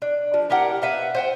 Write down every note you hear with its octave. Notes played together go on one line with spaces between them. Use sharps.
D4
F3
E4 G4 A#4 F#5
B4 E5 F5
C5 F#5 G5